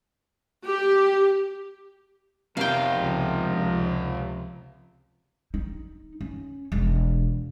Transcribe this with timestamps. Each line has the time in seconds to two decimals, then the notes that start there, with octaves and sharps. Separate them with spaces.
0.66 G4
2.57 F2 C3 B3 D#4 A#4 F5 G5
2.95 C#2 C#3 F3
5.54 D#4
6.21 C#4
6.72 E1